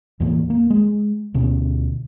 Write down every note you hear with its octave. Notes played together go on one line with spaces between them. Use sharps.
E2 A2 E3 A#3
A#3
G#3
D2 B2 C#4